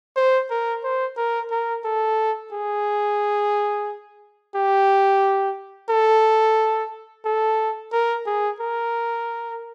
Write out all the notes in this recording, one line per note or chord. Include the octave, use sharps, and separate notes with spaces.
C5
A#4
C5
A#4
A#4
A4
G#4
G4
A4
A4
A#4
G#4
A#4